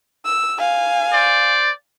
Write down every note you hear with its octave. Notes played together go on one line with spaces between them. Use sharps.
E6
F5 G#5
C5 D5